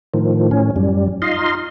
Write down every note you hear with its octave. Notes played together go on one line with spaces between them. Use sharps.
A2 D#3 F3
A2 C#4
F#2 G3
D#4 F4 D#5 F5 C6